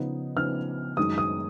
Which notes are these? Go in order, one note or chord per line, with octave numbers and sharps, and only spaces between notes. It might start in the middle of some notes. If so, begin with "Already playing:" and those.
Already playing: C#3 F3 B3 D#4
C#3 F3 B3 D#4 F6
F#2 D#3 G#3 D#4 D#6
D#6